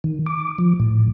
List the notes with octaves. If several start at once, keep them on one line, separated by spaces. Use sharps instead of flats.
D#3
D6
F3
A2